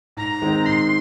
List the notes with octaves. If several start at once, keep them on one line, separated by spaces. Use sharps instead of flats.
G#2 A#5
D#3 G#3 C4 D#4
G#2 C6